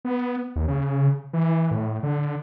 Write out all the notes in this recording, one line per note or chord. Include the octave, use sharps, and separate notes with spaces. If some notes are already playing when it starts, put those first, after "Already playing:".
B3
D#2
C#3
E3
A2
D3